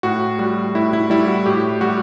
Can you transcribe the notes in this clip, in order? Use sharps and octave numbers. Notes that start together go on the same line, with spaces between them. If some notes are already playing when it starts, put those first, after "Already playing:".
A2 F#4
G3 F#4
A2 E4
E4
G3 E4
F#4
A2 G4
G3 F#4